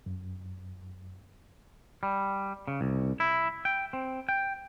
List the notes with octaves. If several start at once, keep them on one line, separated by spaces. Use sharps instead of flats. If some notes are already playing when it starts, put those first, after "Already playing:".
F#2
G3
C#3
C2
E4
G5
C4
G5